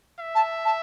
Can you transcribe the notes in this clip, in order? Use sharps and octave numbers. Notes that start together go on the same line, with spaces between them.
E5
A5
A5